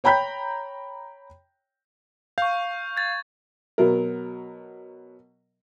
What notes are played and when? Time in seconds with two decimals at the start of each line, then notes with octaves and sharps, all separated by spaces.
0.04 C#5 G5 A#5 B5 G6 B6
2.38 F5 C#6 G6
2.97 G#6 A6
3.78 B2 F#3 A#4